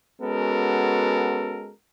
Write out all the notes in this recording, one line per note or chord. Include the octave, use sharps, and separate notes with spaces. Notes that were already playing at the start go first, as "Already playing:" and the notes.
G#3 B3 C#4 F#4 A4 A#4